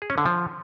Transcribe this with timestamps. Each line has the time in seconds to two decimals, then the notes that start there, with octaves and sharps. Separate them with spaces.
0.02 G#4
0.10 C#4
0.18 D3
0.26 F3